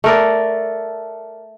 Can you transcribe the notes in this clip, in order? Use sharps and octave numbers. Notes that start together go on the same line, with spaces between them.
A3 A#4 D5